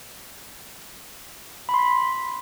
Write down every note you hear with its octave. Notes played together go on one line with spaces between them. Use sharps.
B5
C6
B6